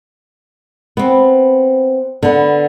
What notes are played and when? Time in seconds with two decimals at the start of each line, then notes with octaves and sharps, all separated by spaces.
0.97 B3 C4
2.23 D3 B3